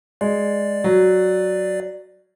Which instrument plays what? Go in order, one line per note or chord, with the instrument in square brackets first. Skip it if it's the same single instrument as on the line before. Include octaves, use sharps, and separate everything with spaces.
[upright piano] G#3 [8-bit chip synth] D5
[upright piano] F#3